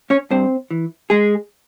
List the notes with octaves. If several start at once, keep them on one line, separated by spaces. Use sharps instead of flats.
C#4 C#5
G2 C4 C5
E3
G#3 G#4